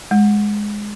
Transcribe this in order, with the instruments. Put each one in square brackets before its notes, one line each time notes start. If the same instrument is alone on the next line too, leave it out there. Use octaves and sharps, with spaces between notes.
[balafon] G#3